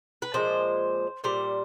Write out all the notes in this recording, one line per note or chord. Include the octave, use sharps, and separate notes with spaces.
B4
A#2 F3 G#3 C5
A#2 G3 C5